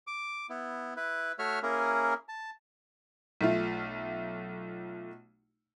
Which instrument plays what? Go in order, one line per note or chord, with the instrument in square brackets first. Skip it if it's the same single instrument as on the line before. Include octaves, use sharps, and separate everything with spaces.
[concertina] D6
B3 E4
E4 B4
A3 F#4 C#5 E5 F6
A#3 C#4 E4 G#4 A#4
A5
[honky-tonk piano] B1 A3 F4